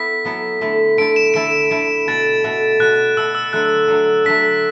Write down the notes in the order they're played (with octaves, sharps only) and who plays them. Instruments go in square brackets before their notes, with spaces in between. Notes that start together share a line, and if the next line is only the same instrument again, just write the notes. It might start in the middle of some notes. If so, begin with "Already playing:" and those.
Already playing: [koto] B3 E4 A4 [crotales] B6
[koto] F#3 B3 E4 A4
D3 A3 E4 A4
[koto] D3 A3 E4 A4 [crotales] D7
[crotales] E7
[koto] D3 A3 E4 A4 [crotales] D7
[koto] D3 A3 E4 A4
[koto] B2 A3 F#4 [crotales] A6
[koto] B2 A3 F#4
[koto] B2 A3 F#4 [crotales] F#6
[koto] B2 A3 F#4 [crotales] E6
[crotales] E6
[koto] D3 F#3 A3 [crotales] F#6
[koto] D3 F#3 A3
[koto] D3 F#3 A3 [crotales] B6